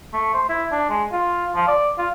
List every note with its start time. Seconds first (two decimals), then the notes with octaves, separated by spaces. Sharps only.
0.14 A3
0.34 C5
0.49 E4
0.72 D4
0.90 G#3
1.12 F4
1.56 F3
1.68 D5
1.98 F4